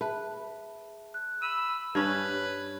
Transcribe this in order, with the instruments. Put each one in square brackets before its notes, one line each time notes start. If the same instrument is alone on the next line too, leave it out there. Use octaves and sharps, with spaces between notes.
[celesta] G#4 E5 A5 [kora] B4
[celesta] F#6
[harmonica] B5 E6 [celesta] D#7
[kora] G2 C#4 [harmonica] B4 [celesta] A5 G#6